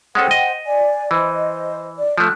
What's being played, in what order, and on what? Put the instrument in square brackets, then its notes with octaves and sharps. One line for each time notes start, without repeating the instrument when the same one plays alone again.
[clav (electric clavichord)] G#3 C#4 A4 [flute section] C5 F#5 G5
[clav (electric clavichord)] D#5
[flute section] D5 G#5
[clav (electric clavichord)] E3 [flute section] C5 D#5
[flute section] D5
[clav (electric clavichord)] F3 A3 [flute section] F#6